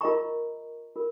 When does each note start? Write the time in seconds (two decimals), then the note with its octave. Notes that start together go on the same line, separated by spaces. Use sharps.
0.01 F4 A#4 D#5 A#5 C#6
0.96 F4 A#4